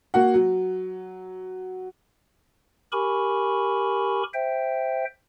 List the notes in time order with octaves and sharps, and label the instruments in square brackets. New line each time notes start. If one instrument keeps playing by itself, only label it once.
[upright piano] A#3 F#4 F#5
F#3
[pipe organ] G4 A#4 G#5 B5 C#6
C5 E5 G5